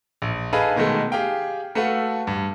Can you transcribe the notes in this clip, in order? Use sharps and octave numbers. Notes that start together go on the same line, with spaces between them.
A#1
D#4 G#4 A4 B4 F5 B5
B2 D#3 G#3 A3
G4 G#4 F5 G5
A3 F#4 A4 B4 F5 F#5
G2